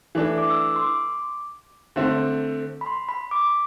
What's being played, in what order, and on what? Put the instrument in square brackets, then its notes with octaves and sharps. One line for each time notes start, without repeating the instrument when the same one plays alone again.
[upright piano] E3 A3 D4
[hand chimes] D6
E6
D6
C6
D6
[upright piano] D3 A3 C4
[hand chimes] B5
C6
B5
D6